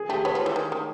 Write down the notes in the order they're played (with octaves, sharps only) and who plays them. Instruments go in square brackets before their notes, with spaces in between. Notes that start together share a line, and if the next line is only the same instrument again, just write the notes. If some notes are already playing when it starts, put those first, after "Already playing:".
Already playing: [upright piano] G#4
[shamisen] A3 [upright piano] G4
[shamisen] B3 [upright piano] C#5
[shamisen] F3
E3
D#3
D#3